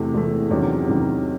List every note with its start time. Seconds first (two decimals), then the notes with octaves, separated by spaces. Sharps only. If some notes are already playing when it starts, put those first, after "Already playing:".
Already playing: E2 C3 E3 A3
0.14 E2 C3 E3 A3
0.50 E2 C3 D#3 F#3 C#4
0.86 E2 C3 D#3 F#3 C#4